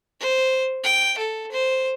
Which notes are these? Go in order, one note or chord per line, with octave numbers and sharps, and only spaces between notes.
C5
G5
A4
C5